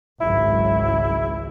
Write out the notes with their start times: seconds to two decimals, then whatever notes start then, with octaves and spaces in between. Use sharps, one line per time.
0.21 G#1 C#2 F#3 E4